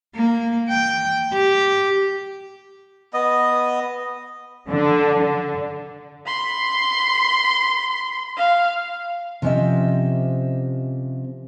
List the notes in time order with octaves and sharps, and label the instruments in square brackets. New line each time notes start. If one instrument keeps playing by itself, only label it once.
[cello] A#3
G5
G4
[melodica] B3 D#5
[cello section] D3
D3
[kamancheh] B5 C6
F5
[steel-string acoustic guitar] C3 F3 C#4 G4 D#5 E5